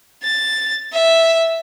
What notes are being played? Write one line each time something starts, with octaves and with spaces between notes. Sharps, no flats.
A6
E5